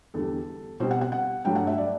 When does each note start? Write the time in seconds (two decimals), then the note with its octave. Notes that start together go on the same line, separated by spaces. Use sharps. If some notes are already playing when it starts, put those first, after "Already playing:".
0.14 E2 D3 G3 A4
0.80 B2 G3 C4 C5
0.91 F#5
1.01 F#5
1.12 F#5
1.45 G2 F#3 A3 G5
1.56 F#5
1.67 E5
1.78 D5